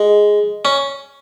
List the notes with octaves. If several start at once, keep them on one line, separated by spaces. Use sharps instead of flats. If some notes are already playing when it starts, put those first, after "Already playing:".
Already playing: G#3
C#4